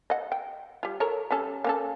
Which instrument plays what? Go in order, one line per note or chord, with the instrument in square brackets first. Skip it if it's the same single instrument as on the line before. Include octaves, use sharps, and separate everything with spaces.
[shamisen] D#5 F#5
G5
G3 F4
A4 A#4 C#5
G3 C#4 A4
A#3 C#4 A4